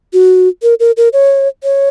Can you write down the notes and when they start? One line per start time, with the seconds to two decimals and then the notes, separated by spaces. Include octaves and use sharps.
0.13 F#4
0.63 A#4
0.80 A#4
0.97 A#4
1.13 C#5
1.64 C#5